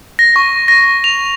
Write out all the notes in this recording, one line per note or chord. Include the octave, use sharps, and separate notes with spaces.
A#6
C#6
A#6
F7